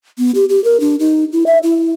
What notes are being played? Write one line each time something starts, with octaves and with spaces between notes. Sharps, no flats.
B3
G4
G4
A#4
D4
D#4
E4
E5
E4